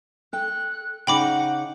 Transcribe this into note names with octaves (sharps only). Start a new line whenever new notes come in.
A4 G5 F#6
C#3 D#4 F#5 G5 B5 D6